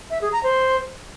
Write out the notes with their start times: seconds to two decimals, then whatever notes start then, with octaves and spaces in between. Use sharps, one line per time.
0.10 E5
0.21 G#4
0.32 A#5
0.43 C5